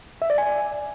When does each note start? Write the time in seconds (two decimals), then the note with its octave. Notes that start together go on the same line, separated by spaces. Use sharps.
0.22 E5
0.30 D5
0.38 G#5